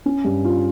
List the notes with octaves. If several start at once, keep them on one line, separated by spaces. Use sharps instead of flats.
C#4
G2
F4